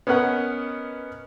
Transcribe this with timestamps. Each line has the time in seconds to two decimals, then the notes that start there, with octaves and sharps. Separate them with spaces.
0.07 B3 C#4 A#4 D#5 F#5